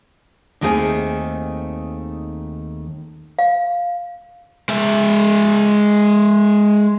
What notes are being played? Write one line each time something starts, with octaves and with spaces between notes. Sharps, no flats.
D#2 D#3 A3 C4 G#4 G#5
F5
G#3 E5